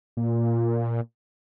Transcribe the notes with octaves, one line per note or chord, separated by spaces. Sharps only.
A#2